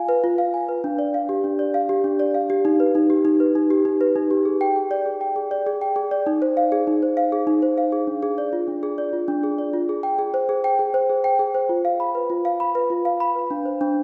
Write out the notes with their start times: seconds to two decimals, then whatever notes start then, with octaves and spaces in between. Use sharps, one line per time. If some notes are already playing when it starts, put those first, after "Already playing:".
Already playing: F4 F5 G#5
0.09 B4
0.24 F4
0.38 F5
0.54 G#5
0.69 B4
0.84 D4
0.99 D5
1.14 F5
1.29 G4
1.44 D4
1.59 D5
1.74 F5
1.89 G4
2.04 D4
2.19 D5
2.34 F5
2.50 G4
2.65 D#4
2.80 B4
2.95 D#4
3.10 G4
3.25 D#4
3.40 B4
3.55 D#4
3.70 G4
3.85 D#4
4.01 B4
4.16 D#4
4.31 G4
4.45 G#4
4.61 G5
4.76 G#4
4.91 D5
5.06 G#4
5.21 G5
5.36 G#4
5.51 D5
5.67 G#4
5.81 G5
5.96 G#4
6.11 D5
6.26 D#4
6.42 C5
6.57 F5
6.72 G#4
6.87 D#4
7.02 C5
7.17 F5
7.32 G#4
7.47 D#4
7.62 C5
7.78 F5
7.92 G#4
8.07 D4
8.23 G#4
8.38 D5
8.53 F4
8.68 D4
8.83 G#4
8.98 D5
9.13 F4
9.28 D4
9.43 G#4
9.58 D5
9.73 F4
9.89 G#4
10.03 G5
10.19 G#4
10.34 C5
10.49 G#4
10.64 G5
10.79 G#4
10.94 C5
11.09 G#4
11.24 G5
11.39 G#4
11.54 C5
11.69 F4
11.85 F5
12.00 B5
12.15 B4
12.30 F4
12.45 F5
12.60 B5
12.75 B4
12.90 F4
13.05 F5
13.20 B5
13.36 B4
13.51 D4
13.65 C5
13.81 D4